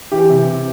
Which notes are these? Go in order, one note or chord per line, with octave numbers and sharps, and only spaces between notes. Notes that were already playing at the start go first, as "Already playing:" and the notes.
E3 G4
C3